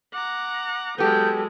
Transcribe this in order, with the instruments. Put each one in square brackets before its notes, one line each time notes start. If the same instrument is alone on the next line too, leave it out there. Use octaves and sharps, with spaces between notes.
[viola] F#5 A#5 [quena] D6
[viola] F#3 G#3 [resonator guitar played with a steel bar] B3 G4 [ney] A4 [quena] G6